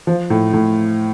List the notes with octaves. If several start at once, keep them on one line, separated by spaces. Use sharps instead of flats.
F3
A2
A2